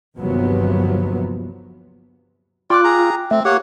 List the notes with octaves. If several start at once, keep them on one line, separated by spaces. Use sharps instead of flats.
G1 D#2 C3 F3 F#3 B3
F4 D5 G5 D6 F#6
G#4 A#5
A3 C4
A#3 G4 C#5 F#5